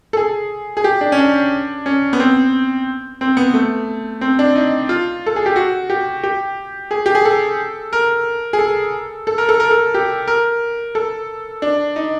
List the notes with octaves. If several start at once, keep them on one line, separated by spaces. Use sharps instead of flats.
A4
G#4
G#4
G4
D4
C#4
D4
C#4
B3
C4
C4
B3
A3
C4
D4
D#4
F4
A4
G#4
G4
F#4
G4
G4
G#4
G4
G#4
A4
A#4
G#4
A4
A4
A#4
A4
A#4
A4
G4
A#4
A4
D4
D#4